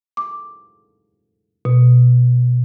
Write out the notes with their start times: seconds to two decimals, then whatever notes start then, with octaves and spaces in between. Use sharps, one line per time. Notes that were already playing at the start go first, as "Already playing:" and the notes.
0.17 D6
1.65 B2